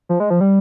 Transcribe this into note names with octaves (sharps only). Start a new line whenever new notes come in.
F3
G#3
F3
G3